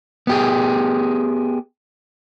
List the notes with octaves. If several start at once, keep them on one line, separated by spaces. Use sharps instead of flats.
B3 G4 G#4